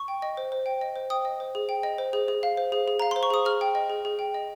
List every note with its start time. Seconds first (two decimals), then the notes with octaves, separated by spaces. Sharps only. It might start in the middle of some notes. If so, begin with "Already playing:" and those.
Already playing: C#6
0.08 G5
0.22 D#5
0.37 C5
0.52 C5
0.66 G5
0.81 D#5
0.96 C5
1.10 G5 D#6
1.25 D#5
1.40 C5
1.55 G#4
1.69 G5
1.83 D#5
1.98 C5
2.13 G#4
2.28 G#4
2.43 F5
2.57 C5
2.72 G#4
2.88 G#4
3.00 F5 A#5
3.11 C5 C6
3.23 C#6
3.30 G#4 D#6
3.46 G#4 F6
3.61 G5
3.75 D#5
3.90 G#4
4.05 G#4
4.19 G5
4.34 D#5